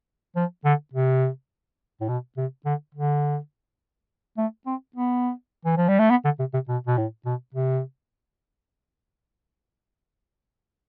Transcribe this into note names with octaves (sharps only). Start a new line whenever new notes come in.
F3
D3
C3
A2
B2
C3
D3
D3
A3
C4
B3
E3
F3
G3
A3
B3
D3
C3
C3
B2
B2
A2
B2
C3